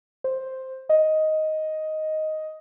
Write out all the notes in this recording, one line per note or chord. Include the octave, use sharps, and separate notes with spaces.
C5
D#5